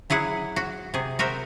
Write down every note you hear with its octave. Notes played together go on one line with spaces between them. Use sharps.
F#3 E4 G#4 F#5
F#4
C3 G#4
F#4 A#4 C5 E5